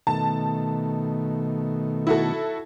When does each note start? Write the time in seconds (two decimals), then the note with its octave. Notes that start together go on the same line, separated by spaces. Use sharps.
0.07 B2 D#3 A3 A5
2.07 E4 F#4 A4